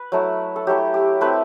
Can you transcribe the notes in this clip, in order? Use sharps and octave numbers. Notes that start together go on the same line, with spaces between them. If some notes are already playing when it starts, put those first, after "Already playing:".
Already playing: B4
F#3 A3 E4
A4
F#3 A3 E4 G4
G4
A3 C4 E4 G4 B4